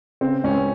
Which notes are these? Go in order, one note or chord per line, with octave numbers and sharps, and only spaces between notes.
C#3 C4
C#2 C#4